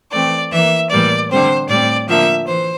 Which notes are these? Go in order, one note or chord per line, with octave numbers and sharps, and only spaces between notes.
E3 A3 C4 D5
E3 A#3 E5
A2 E3 G3 A#3 D5
D3 G3 C4 C5
A2 G3 C4 D5
D3 F3 A#3 E5
E3 C5